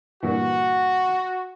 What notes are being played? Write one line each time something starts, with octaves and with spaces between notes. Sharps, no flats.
G2 A#2 E3 F#4